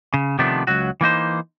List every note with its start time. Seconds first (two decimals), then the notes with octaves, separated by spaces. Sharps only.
0.14 C#3
0.39 C3 D#3 F3 A3 B3 D4
0.67 C#2 F#3 F#4
1.01 E3 A#3 D#4 C5